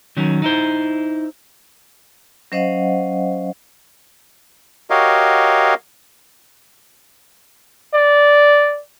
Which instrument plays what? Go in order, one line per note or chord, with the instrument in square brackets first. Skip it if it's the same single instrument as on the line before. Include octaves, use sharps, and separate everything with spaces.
[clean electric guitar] D#3 F#3 C#4
D#4 E4 C5
[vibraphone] F#3 C#4 C5 D#5 F5 F#5
[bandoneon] F#4 G4 A#4 C#5 D#5 F5
[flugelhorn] D5